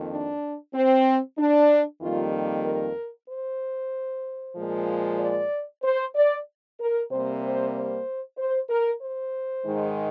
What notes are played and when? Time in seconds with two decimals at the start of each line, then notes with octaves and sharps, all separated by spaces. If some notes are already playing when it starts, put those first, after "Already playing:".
Already playing: F2 D#3 A#3
0.10 D4
0.74 C4
1.38 D4
2.01 F2 D#3 G3 A#3 F4
2.33 G4
2.65 A#4
3.28 C5
4.56 A#2 F3 G#3
5.19 D5
5.83 C5
6.16 D5
6.80 A#4
7.11 C3 G3 A#3 C5
7.43 C5
7.75 C5
8.38 C5
8.70 A#4
9.01 C5
9.66 G#2 D#3 G#3